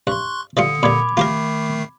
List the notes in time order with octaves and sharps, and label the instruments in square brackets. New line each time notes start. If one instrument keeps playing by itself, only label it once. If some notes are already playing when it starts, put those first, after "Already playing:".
[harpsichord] G2 [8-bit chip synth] C6 C#6 F#6
[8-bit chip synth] D3 [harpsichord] E3 G3 F4 [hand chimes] D#6 C#7
[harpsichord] A#2 G3 [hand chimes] B5 D6 G#6
[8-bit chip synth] D#3 A3 C7 [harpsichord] F4 G4 A#4